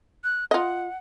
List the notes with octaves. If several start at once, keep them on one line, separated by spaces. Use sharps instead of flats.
F#6
F4 D#5 F#5